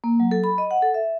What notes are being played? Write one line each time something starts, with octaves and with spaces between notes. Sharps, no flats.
A#3
F#3
A4
B5
D#5
F#5
A4
E5